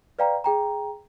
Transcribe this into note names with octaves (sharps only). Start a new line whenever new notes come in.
B4 D5 F5 G5 A#5
G#4 G5 A#5